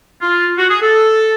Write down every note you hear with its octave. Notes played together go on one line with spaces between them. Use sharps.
F4
F#4
G#4
A4